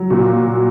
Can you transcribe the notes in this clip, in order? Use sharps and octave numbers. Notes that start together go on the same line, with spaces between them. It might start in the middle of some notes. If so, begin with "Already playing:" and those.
Already playing: F#3
A#2 F#4